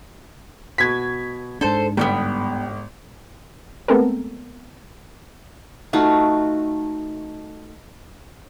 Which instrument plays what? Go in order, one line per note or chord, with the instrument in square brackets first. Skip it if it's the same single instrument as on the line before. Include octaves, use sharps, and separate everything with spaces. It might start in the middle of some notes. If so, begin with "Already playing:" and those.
[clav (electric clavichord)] B2 F#4 [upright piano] G#6 B6
[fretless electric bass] G#2 D4 [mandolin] A4 C5
[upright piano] G1 [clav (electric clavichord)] G3 [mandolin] B3 C#4 G5
[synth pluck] G#3 A3 B3 C4 A4 A#4
[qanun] A3 D#4 F4 F#4